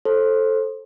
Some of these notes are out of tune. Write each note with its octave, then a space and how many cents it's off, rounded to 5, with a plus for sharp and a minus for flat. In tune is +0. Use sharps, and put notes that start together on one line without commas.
A4 +0 C5 +20